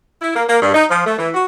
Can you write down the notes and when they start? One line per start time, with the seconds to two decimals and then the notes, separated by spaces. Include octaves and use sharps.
0.21 E4
0.35 A#3
0.47 A#3
0.61 G2
0.73 D#4
0.89 F3
1.05 A3
1.17 E3
1.34 F#4